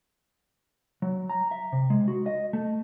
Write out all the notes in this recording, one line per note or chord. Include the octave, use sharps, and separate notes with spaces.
F#3
A#5
E5
C3
G#3
F#4
D#5
A3